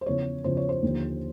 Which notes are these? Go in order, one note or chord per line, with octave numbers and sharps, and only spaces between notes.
C5
E2 C#3 F3 C#5
E2 C#3 F3 C5
C#5
C5
D#2 D3 F3